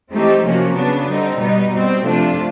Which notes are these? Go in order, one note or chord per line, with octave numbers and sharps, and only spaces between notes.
E3 A3 C4 D#4 G4
C3 F3 A#3 C#4 F#4
C#3 F#3 B3 D4
D3 G3 C4 D#4
B2 G3 B3 D#4
B2 G3 C4
C3 F3 A3 D4 F4